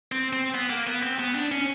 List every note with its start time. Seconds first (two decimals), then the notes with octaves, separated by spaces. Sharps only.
0.12 C4
0.33 C4
0.54 B3
0.70 A#3
0.87 B3
1.03 C4
1.19 B3
1.35 D4
1.51 C#4